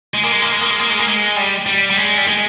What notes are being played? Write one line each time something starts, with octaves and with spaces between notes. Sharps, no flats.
G#3
A#3
G#3
A#3
G#3
A#3
G#3
A#3
G#3
A#3
G#3
G3
G3
G3
G#3
G3
G#3